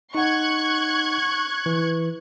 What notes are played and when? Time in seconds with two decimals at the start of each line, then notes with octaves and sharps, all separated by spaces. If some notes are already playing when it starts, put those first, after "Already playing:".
0.15 D#4 F#5 C#6 F#6 G#6
1.66 E3